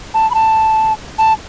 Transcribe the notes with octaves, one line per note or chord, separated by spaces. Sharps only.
A5
B5
A5
A5